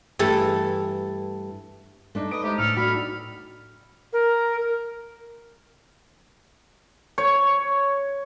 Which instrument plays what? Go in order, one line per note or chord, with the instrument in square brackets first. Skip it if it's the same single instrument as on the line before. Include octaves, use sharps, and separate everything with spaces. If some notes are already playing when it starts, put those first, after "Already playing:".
[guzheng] G2 E3 A3 A4
[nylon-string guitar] A3 D4 D#4
[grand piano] B4 B5 D7 [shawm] D#5
[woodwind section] G#3 [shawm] G4 [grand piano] C5 E5 A#5
[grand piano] A2 [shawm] A4 [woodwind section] F6
[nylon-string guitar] D4 D#4 F#4 [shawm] B5
[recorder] A#4
[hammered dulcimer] C#5